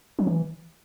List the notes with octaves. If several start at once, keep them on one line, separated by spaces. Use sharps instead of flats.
F#3
E3